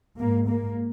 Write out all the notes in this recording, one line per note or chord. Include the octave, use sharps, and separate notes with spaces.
G#2 A#3
A#3